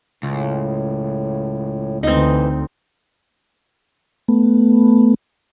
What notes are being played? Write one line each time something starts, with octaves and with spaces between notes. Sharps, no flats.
C#2 A2
D2 E3 C4 D#4
A3 B3